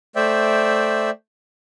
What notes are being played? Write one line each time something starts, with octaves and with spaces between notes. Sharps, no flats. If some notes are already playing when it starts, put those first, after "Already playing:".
A3 C5 D5 E5 G5